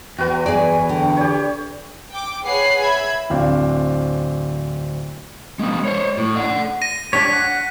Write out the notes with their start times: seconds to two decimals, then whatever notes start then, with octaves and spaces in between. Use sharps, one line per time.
0.19 E2 F#4 B4 G5
0.46 G#4 D5 G#5
0.89 D3 G5
1.17 G4 C#5 D5
2.11 G5 D6
2.43 G#4 B4 C#5 F#5 B5 C7
2.82 E5 B5 G#6
3.30 D1 C4 D4 F5
5.59 G#3 B3
5.85 C5 C#5
6.17 A2
6.36 D5 F#5
6.82 A#6 D#7
7.13 D4 G4 C#5 B6
7.33 F#5